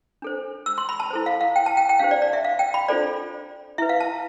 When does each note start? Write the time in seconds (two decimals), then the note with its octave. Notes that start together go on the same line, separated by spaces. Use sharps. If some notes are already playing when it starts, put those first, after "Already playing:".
0.22 D4 A4 C5
0.66 E6
0.78 C6
0.89 B5
1.00 A5
1.10 E4 A4 C5
1.26 F5
1.41 F5
1.56 G5
1.66 A5
1.77 G5
1.89 G5
1.99 D4 G4 C5 F5
2.11 D5
2.22 D5
2.33 E5
2.45 F5
2.59 G5
2.74 B5
2.88 D4 F4 A4 C5 D5
3.78 E4 B4 E5
3.89 F5
4.00 A5